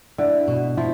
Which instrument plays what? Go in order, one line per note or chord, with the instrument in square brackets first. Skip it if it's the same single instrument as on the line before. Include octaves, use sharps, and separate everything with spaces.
[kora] D3 [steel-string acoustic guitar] E4
[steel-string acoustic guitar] B2
[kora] F3 [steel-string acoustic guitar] E4